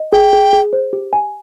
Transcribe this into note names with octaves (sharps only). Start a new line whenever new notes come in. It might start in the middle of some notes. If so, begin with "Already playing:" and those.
Already playing: D#5
G#4 G5
G#4
G#4
C5
G4
G#5